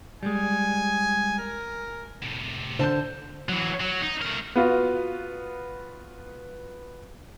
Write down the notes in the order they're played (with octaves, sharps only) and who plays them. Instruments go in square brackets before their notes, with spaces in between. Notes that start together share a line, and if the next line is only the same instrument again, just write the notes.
[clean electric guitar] G3 G#3 [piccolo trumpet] G#5
[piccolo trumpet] A#4
[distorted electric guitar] A2 C3
[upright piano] D3 G6 [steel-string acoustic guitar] C5 A5
[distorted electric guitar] E3 F#3
F#3
D#4
A3 A#4
[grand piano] B3 F4 F#4